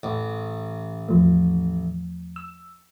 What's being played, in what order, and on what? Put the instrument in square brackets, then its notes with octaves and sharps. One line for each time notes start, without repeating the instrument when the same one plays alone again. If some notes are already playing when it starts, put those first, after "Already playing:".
[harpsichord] A1
[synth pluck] E2 F3 A3
E6